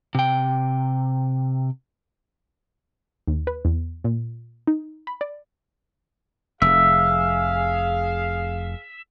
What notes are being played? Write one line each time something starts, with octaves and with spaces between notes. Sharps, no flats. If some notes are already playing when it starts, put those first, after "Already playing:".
C3 G5
D#2
B4
E2
A#2
D#4
B5
D5
F1 G#4 E5 F5